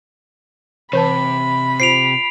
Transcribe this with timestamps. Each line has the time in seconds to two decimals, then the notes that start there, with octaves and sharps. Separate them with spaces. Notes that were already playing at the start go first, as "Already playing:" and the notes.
0.93 C3 E3 B4 A5 B5
1.80 F4 C5 C7 D7 F7